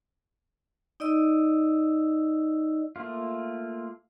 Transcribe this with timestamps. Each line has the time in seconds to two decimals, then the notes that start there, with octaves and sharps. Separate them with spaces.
1.00 D#4 D5 D#5 E6
2.96 A3 A#3 F4